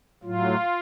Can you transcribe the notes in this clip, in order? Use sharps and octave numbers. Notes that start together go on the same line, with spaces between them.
A2 F#3 F4